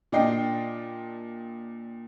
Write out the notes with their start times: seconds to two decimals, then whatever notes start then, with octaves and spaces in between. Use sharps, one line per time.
0.12 A#2 D4 D5 D#5 G5 C7